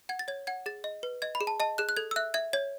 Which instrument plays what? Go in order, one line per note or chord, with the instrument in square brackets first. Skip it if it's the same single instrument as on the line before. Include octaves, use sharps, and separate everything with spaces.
[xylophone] F#5 G#6
A6
C#5 G#6
F#5 G#6
G#4 A6
D#5
B4
D#5 G#6
B5
G#4
A5
D#5 A5
G#4 F#6
F#6
A4 G#6
E6
E5 F#6
E5 G#6
C#5 G#6